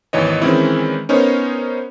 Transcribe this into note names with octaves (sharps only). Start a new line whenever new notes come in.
G#1 D#2 E3 C#5 D#5
D#3 E3 G#3 C4 C#4 E4
B3 C#4 D#4 A#4 C5 C#5